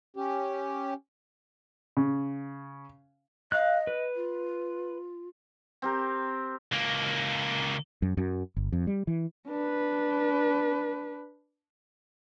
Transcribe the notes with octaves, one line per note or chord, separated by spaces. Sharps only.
C#4 G4
C#3
D#5 F5 F#6
B4
F4
C4 G4 A#4
C#2 A#3
F#2
F#2
G1
F2
G3
E3
D4 B4